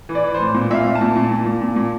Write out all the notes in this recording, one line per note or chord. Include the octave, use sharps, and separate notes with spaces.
E3
D5
E3
C5
A2
A#2
A#2 E5 F5
A#2
A5
A#2
A#2
A#2
A#2
A#2
A#2